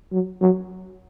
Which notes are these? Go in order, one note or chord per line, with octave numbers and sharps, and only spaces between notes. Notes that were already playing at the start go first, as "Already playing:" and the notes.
F#3
F#3